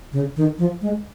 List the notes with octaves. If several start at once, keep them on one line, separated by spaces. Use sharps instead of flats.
C#3
D#3
F3
G#3